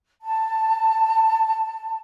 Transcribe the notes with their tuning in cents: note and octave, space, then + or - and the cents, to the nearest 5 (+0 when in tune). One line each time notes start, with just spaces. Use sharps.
A5 +10